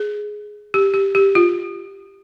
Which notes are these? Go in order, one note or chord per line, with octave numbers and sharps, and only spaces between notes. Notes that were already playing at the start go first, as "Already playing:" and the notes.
Already playing: G#4
G4
G4
G4
F4